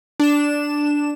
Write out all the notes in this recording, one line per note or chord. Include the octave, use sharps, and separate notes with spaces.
D4 E7